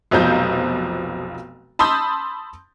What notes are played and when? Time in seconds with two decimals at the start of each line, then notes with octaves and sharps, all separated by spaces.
0.11 F1 B1 B2 F3 A#5 G6
1.79 A5 B5 C6 D#6 E6 G6